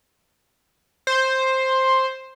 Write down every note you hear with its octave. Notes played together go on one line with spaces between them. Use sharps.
C5